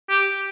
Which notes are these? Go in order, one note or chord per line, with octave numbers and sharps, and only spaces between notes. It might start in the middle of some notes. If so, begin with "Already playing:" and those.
G4